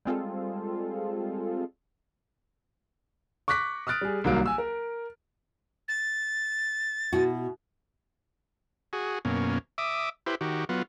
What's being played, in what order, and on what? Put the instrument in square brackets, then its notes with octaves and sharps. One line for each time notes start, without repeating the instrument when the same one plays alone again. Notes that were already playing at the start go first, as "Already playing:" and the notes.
[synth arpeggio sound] G3 G#3 C4 F4 G#4 A4
[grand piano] C#6 D6 F#6 A#6 B6
D#6 F6 F#6 A6 D7
G3 G#4
C2 D#3 F#3 A#3 F5 D7
G#5 E6
A#4
[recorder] A6
[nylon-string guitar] B2 E4 F#4
[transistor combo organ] F#4 G#4
F#2 B2 A#3 C#4
E5 D6 D#6
E4 G4 B4 C5
D#3 F#4 G4
F#3 B3 F4